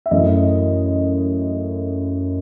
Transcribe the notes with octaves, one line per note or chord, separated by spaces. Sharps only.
E5
F#2 E3 A3 D#5